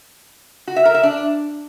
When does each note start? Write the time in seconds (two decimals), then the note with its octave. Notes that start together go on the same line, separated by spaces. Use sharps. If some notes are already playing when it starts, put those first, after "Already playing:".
0.67 F#4
0.76 E5
0.85 A#4
0.94 E5
1.03 D4